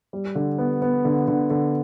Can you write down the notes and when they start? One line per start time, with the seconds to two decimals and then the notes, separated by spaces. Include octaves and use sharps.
0.13 G3
0.35 D3
0.58 B3
0.82 B3
1.05 D3
1.28 D3
1.50 D3